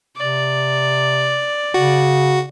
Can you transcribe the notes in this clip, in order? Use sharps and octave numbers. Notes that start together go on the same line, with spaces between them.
C3 D5
C#3 F#4